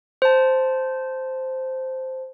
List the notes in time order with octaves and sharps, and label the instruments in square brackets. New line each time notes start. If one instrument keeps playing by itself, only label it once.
[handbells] C5 A5